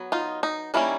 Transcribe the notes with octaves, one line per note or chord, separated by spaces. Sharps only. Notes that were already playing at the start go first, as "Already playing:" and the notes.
Already playing: F#3 B3
D#4 F4
D#4
D#3 G3 A#3 C#4 E4